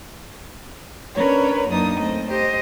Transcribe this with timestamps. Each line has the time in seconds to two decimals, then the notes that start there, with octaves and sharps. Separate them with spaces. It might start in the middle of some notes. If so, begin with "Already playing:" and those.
1.15 C#4 D4 A#4 B4 C#5
1.68 F#2 A#3 D4 D#4 D#6
1.99 A3 C4 D#5
2.28 G4 C5 D#5